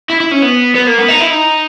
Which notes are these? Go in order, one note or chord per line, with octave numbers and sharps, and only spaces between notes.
E4
E4
C#4
B3
B3
A#3
B3
D#4
E4
D#4